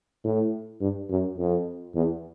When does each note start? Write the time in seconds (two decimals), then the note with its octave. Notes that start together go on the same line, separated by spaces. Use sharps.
0.24 A2
0.81 G2
1.10 F#2
1.38 F2
1.95 E2